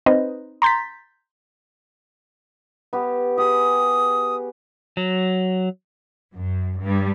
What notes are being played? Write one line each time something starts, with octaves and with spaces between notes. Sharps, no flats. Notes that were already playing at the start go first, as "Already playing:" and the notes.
C4 D#4 B4 C5 D#5
A#5 C6 G6 A6 B6
B3 G4
G4 G#4 D#6
F#3
F#2
G2 G3